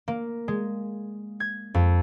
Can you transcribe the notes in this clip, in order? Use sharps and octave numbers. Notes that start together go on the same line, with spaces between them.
A#3
G#3
G#6
F2